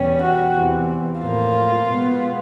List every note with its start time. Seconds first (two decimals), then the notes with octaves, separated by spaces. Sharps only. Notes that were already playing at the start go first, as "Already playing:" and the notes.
Already playing: E2 B2 G3 C#4
0.22 F#4
0.55 E2 C3 E3
1.22 A2 F3 A#3 F4
1.87 B2 G#3 B3